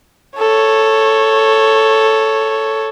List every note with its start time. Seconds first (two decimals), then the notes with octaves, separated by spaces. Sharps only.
0.38 A4 C#5